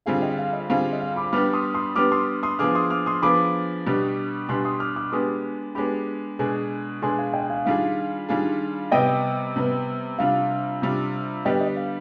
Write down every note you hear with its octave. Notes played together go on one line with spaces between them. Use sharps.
D3 G3 C4 F4 G#4 F5
D#5 G5
F5
D#5
D3 G3 C4 F4 G#4 F5
D#5
F5
B5 D6
G3 B3 D4 G4 D6 F6
C6 D#6
C6 D#6
G3 B3 D4 G4 D6 F6
C6 D#6
C6 D#6
F3 B3 D4 G#4 D6 F6
C6 D#6
D6 F6
C6 D#6
F3 B3 D4 G#4 B5 D6
B2 G3 D4 G4
B2 G3 D4 G4 G#5 C6
C6 D#6
D6 F6
D6 F6
G#3 B3 D4 G4 C6 D#6
G#3 B3 D4 G4 B5 D6
B2 G#3 D4 G#4
B2 G#3 D4 G#4 G#5 C6
F5 G#5
D#5 G5
F5 G#5
D#3 G3 D4 F4 G#4 F5
D#3 G3 D4 F4 G#4
C3 G3 B3 D#5 G5
C3 G3 B3
C3 G3 D4 F4 F5
C3 G3 D4 F4
D3 G3 B3 D4 G4 D#5 G5
D#5
F5